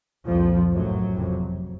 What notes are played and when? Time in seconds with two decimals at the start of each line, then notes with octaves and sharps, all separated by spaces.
0.27 C2 F2 A#2 F3
0.71 A1 F#2 A2 F#3
1.15 F#1 F2 C3